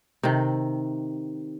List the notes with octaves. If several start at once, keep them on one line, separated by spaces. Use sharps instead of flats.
C3 D#3